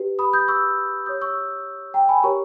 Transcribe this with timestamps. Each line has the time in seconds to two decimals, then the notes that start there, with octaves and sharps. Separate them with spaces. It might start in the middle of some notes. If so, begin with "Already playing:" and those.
Already playing: G4 B4
0.19 B5 D#6
0.33 D#6 G6
0.48 C#6 E6
1.06 G4 C#5 D#6 G6
1.21 C#6 E6
1.94 G5 A#5
2.09 G#5 B5
2.23 G4 A#4 C#5 A#5 C#6